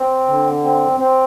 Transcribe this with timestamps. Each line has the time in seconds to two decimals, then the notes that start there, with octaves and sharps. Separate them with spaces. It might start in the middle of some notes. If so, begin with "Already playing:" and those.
Already playing: C4
0.28 D3
0.64 C4
1.00 C4